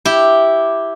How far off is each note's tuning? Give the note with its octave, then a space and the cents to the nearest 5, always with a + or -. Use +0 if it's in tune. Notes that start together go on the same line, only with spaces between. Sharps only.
E4 +0 G4 +0